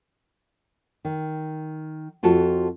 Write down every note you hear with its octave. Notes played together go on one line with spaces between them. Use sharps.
D#3
F2 F4 F#4 A4 A5